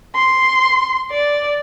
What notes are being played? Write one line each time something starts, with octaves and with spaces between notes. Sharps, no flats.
C6
D5